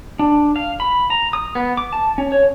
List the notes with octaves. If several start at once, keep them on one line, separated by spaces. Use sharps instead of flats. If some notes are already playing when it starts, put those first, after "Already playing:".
D4
F5
B5
A#5
D#6
B3
D6
A5
C#4
C#5